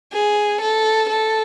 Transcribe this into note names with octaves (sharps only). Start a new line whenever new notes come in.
G#4
A4
A4